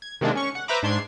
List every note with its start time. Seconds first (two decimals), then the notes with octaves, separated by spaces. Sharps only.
0.02 G#6
0.21 C3 D#3 G#3 A#3 D4
0.35 C#4 C#6
0.55 F#5
0.68 B4 C5 E5 A#5 B5 D6
0.83 G#2 D4 C6 G#6 C7